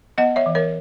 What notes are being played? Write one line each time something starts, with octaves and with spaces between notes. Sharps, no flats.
B3 D#5 F#5
C#5 E5
E3
A#4 C#5